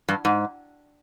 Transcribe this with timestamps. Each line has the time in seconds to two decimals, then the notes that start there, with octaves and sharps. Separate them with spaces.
0.09 G2
0.25 G#2